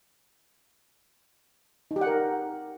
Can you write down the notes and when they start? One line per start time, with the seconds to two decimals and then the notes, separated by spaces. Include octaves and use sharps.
1.91 D#4
1.96 G4
2.01 F#5
2.07 A#4